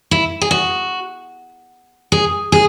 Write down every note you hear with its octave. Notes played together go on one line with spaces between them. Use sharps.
E4
G#4
F#4
G#4
G#4